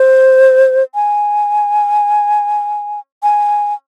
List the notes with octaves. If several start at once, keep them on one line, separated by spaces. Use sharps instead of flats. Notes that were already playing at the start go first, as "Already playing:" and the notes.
Already playing: C5
G#5
G#5